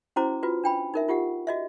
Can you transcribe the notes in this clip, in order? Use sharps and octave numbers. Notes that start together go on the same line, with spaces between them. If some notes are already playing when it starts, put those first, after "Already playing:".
C#4 E4 F#4 C5 A#5 D6
F4 F#4 B4
D4 G5 B5
D#4 A#4 E5
F4 G4 F#5
F#4 D#5 E5